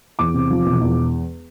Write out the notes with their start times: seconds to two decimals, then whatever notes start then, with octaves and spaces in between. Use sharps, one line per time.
0.19 E2 D6
0.34 C3
0.51 F3
0.66 E1
0.81 E2